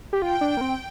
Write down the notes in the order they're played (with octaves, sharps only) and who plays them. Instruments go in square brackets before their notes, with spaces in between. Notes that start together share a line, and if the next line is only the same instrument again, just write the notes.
[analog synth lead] G4
[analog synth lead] F4 [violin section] G5
[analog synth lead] D4
A#3
C4